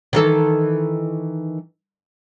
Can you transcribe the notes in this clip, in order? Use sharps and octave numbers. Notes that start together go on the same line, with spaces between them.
D#3 E3 A4